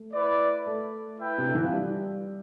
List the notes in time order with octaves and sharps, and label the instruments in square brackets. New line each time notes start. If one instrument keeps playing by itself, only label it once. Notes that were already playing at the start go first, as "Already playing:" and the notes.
Already playing: [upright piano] A3
[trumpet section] E4 B4 D5
[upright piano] A3
[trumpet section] E4 B4 E5 G5
[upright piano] C3
D3
E3
F3
G3